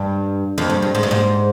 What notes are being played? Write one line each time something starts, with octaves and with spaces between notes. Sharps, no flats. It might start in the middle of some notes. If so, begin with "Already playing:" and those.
Already playing: G2
F2
G2
G2
G#2
G2
G#2